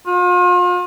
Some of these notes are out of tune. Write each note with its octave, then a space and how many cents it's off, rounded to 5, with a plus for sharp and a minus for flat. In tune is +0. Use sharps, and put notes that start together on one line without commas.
F4 +40